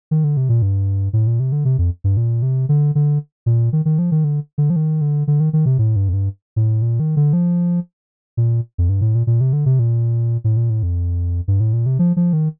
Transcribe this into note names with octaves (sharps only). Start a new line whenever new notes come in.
D#3
D3
C3
A#2
G2
A2
A#2
C3
D3
C3
F2
G2
A#2
C3
D3
D3
A#2
D#3
D#3
F3
D#3
D3
D3
F3
D#3
D3
D3
D#3
D#3
C3
A2
G2
F2
G2
A2
A#2
D#3
D3
F3
A#2
F2
G2
A2
A#2
A#2
C3
D3
C3
A#2
A2
A#2
A2
F2
G2
A2
A#2
C3
F3
F3
D#3